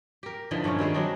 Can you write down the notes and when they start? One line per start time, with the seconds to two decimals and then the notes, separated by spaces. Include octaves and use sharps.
0.23 G4 A#4
0.51 D3 E3 F3 D#4
0.64 G2 A#2 A3 C#4
0.79 D#3 G3 G#3 C4
0.94 F#3 G#3 D4 D#4